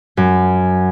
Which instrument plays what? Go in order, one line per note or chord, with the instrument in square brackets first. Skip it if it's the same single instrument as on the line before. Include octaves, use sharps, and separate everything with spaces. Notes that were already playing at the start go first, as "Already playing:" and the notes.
[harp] F#2